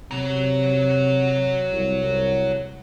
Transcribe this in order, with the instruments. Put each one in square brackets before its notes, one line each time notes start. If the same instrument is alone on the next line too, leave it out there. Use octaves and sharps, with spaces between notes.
[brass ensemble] C3 [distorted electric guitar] F#3 A#5
[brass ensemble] C2